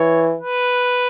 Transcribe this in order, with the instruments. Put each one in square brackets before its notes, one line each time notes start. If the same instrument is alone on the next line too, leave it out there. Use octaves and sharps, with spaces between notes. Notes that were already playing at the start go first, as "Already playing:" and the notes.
Already playing: [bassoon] E3 [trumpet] C#5
[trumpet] B4